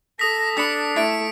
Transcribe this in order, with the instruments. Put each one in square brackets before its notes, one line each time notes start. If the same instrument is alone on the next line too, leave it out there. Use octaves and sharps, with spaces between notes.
[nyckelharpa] A4 [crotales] D#6 B6 [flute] A#6
[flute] D4 [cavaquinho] A5 B5 [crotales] D#6 B6 C#7
[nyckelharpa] A3 A4 [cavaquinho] E4 [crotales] B6 D7